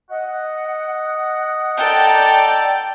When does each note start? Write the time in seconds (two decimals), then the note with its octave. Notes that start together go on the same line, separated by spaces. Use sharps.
0.10 D#5 F#5
1.77 A4 D5 G5 A#5